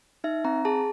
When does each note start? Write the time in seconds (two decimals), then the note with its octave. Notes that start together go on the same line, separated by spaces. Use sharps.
0.24 D#4 E5
0.44 C4 A#5
0.65 G#4 A5